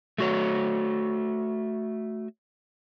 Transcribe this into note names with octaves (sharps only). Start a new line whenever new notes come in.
A3 F#4 C#5